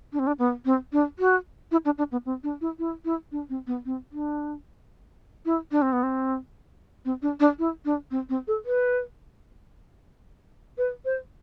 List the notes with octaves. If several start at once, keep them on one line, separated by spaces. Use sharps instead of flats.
D4
C4
D4
B3
C4
D4
F#4
E4
D4
D4
B3
C4
D4
E4
E4
E4
D4
C4
B3
C4
D4
E4
D4
C4
B3
C4
C4
D4
D4
E4
D4
C4
C4
A4
B4
B4
C5